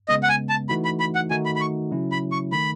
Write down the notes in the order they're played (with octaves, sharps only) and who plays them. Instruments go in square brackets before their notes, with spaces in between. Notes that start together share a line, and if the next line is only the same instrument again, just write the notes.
[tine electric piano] C#3 G#3 B3 [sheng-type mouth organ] D#5
[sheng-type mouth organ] F#5
G#5
A5
[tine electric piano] E3 A3 D#4 F#4 [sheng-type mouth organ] B5
[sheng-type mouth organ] B5
B5
F#5
[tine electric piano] D#3 A3 D#4 F#4 [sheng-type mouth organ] G#5
[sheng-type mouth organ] B5
B5
C#6
[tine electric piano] C#3 F#3 C#4 E4
[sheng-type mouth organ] B5
C#6
[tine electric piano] D#3 A3 [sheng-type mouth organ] B5